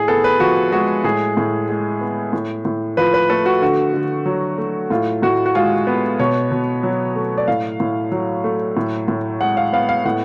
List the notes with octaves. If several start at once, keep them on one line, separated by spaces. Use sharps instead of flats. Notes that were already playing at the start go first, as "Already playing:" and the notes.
Already playing: A2 G#4
B3 A4
B4
F3 F#4
G#3 F#4
A2 G#4
A2
G#3
B3
A2
A2
F3 B4
B4
A3 A4
F#4
D3 F#4
D3
F#3
A3
A2 F4
A2 F#4
F#4
G#3 F4
B3
B2 C#5
B2
F#3
A3
D5
A2 F5
A2
F#3
A3
A2
A2
G#3 F#5
F5
B3 F5
F5
A2 F#5